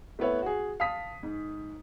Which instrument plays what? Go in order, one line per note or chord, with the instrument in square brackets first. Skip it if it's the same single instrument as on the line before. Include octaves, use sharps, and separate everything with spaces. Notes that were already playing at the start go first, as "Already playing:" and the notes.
[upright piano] A3 B3 E4 B4 C#5 E5
F#4 G#4
F5 A5 D#6 B6
G#2